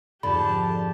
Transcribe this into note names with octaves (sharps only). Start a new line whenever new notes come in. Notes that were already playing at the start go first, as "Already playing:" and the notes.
F2 G#2 D3 G4 A5 B5